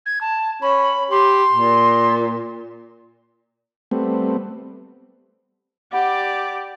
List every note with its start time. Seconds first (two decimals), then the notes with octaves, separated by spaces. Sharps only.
0.06 G#6
0.21 A5
0.62 C#4 B5
1.11 G4 C6
1.52 A#2
3.91 G3 A3 B3 C4
5.93 G4 D5 F#5 B5